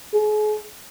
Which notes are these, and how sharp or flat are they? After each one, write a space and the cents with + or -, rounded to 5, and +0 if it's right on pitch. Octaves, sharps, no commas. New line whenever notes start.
G#4 +40